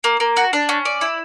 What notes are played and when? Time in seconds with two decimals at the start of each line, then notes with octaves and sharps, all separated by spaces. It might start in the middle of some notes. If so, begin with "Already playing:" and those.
0.04 A#3
0.20 A#3
0.37 F#4
0.53 D4
0.69 C#4
0.85 D5
1.01 E4